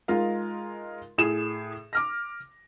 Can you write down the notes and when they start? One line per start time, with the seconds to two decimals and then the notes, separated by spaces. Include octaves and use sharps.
0.08 G#3 D#4 F4 A#4 F5
1.18 A2 G#4 E7
1.93 D6 F6 A#6